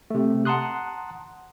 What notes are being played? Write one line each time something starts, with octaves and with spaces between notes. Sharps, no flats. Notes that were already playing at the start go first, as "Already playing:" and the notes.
C3 A3
F#5 A5 A#5 C6 D#6 F#6